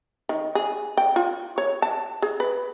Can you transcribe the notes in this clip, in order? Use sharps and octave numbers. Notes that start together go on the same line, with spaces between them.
D#3
G#4
G5
F4
C#5
A5
G#4
B4